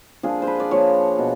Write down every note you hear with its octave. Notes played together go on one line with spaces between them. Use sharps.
F3 A#3 D4 G#4
C5
B4
D5
F3 A#3 D4 C#5
B2